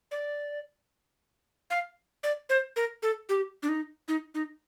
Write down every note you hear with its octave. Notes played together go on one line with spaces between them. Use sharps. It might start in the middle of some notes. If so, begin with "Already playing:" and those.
D5
F5
D5
C5
A#4
A4
G4
D4
D#4
D#4
D#4